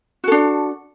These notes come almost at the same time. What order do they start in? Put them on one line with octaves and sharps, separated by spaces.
F#4 A4 D4